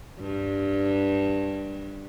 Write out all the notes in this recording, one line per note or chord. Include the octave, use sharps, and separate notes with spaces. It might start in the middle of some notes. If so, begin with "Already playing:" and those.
G2